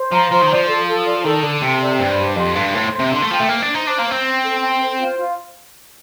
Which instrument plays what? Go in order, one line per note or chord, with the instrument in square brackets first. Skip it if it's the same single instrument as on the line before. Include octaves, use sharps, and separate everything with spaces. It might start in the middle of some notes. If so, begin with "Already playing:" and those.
Already playing: [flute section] C5
[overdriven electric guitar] F3 [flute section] A#5
[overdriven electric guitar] F3 [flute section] C5
[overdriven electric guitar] D#3
[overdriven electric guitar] F3 [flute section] D5
[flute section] A4
A4
D5
[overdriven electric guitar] D#3 [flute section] A4
[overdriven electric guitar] D3 [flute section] A4
[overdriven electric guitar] C3 [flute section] G5
[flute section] D5
[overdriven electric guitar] G2 [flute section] C5
[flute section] G4
[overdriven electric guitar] F2 [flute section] C6
[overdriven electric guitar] G2 [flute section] C6
[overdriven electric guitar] A2 [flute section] C5
[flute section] C6
[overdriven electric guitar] C3
[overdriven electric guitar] D3 [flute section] C6
[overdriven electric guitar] A3
[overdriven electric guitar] F3 [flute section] G5
[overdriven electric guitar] A3
[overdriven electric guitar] A#3 [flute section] C5
[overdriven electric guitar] D4
[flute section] C5
[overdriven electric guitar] D#4
[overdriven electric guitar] D4 [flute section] C5
[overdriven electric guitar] A#3
[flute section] C5
[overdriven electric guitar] C4
[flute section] G5
A4
G5
C5
F4
F4